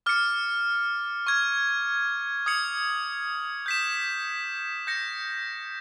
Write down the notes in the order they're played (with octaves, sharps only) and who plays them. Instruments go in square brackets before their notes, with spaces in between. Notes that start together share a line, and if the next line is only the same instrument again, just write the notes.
[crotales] D6 F6 A6 C#7
C#6 F6 G#6
D#6 G#6 C#7 F#7
G6 B6 E7
G6 A#6 C#7